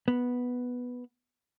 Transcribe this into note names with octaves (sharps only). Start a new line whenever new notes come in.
B3